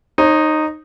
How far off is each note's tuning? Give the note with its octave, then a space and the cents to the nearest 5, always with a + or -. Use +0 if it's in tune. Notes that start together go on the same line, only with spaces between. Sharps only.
D#4 -10 C#5 -45